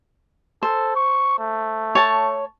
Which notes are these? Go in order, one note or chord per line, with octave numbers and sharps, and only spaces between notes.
A4 C5
C#6
A3
C#5 A5